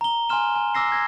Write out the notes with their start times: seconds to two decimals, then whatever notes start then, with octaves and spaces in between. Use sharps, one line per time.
0.01 A#5 G7
0.29 G#5 A#5 C6 F6 E7
0.55 G#5
0.75 D6 E6 A#6 C7
0.90 E6 G#6 A#6